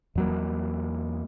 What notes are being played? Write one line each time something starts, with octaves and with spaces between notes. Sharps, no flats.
E2 F#3 A#3